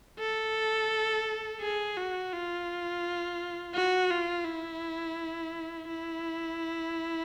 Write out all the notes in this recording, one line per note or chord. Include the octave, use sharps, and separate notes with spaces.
A4
G#4
F#4
F4
F#4
F4
E4
E4